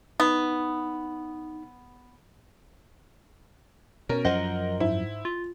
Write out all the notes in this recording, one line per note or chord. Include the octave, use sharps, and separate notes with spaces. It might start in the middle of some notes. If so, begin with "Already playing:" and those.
B3 D#4
B2 C#4 A#4
F#2 F3 C5 D#5 F#5
G#2 E4
F4